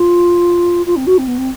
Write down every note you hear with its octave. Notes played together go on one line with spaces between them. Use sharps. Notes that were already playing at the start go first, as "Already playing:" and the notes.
Already playing: F4
F4
C4
F#4
C4
B3
C4